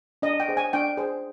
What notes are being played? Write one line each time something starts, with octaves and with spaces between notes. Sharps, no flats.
D4 D#5
G5
G#4 C5
G#5
D4 G5
G#4 C5